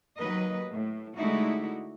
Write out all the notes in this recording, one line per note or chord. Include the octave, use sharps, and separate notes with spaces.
D#2 F#3 B4 D#5
A2
D3 G#3 A3 D#4 E4 F#4